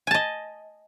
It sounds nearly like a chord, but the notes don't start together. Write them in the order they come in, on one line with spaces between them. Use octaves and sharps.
G#5 A5 D#5